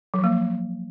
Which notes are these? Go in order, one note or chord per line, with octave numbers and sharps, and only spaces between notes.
F3 F#3 A#3